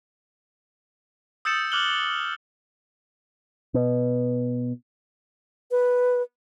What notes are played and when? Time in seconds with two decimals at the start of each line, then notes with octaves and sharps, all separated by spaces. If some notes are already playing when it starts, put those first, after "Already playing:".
1.45 D#6 E6 G6 A6 C#7 E7
1.72 D6 F6 F#6 F#7 G7
3.74 B2
5.71 B4